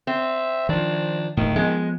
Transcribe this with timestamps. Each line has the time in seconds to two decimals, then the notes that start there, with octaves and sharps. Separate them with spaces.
0.07 C4 E5
0.69 D#3 F3 D4
1.37 D1 D2 A2 D#3
1.56 F3 G#3 B3